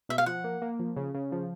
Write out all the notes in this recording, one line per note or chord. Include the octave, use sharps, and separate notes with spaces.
B2 E5
F5
F3 F#5
A#3
A#3
F3
C#3
C#3
F3